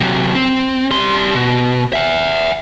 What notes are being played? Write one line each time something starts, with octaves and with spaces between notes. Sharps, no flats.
C3 F#3
C4
G3 C6
B2
E5 F#5